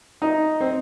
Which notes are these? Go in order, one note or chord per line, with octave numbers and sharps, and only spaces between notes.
D#4
C4